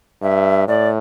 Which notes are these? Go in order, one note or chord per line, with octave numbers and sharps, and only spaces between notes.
G2 E5
A2 D5